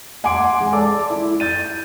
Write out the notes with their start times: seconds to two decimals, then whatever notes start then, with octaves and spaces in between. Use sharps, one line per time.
0.24 F#5 G#5 C6 D6 D7
0.60 G#3
0.73 A4 D5 D6
1.10 E4
1.40 G6 A6 D#7